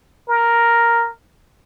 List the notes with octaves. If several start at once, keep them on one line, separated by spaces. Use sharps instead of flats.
A#4